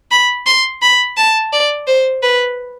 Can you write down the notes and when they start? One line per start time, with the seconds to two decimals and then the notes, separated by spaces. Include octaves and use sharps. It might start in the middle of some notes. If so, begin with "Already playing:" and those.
0.11 B5
0.46 C6
0.82 B5
1.17 A5
1.53 D5
1.87 C5
2.23 B4